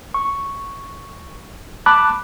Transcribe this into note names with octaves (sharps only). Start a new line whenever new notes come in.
C#6
A5 B5 D6 F#6